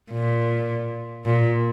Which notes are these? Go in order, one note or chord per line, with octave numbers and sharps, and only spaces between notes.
A#2
A#2